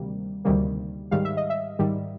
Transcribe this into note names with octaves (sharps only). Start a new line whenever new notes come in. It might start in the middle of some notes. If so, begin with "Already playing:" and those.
Already playing: D2 C3 D#3 G3 A#3
D2 C3 D#3 G3 A#3
G#2 D#3 G3 F5
E5
D#5
E5
G#2 D#3 G3